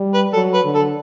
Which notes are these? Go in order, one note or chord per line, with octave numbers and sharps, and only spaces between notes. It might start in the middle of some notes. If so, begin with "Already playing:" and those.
Already playing: G3
B4
F#3 A4
B4
D3
A4